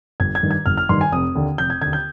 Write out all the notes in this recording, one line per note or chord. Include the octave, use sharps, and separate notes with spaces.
G1 G#6
G#6
G2 D#3
G#6
G1 F6
F6
G2 D#3 C6
G#5
F1 D#6
D#2 D3
F1 G6
G#6
D#2 D3 G#6
G6